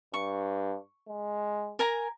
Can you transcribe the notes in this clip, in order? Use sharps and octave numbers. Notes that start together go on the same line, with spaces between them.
G2 C#6
G#3
A#4 G#5 A#5